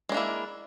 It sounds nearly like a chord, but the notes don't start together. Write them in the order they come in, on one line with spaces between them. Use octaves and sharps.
G#3 D4 A#3 E4